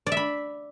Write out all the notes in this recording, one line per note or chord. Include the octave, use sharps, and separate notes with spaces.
D5
E5
B5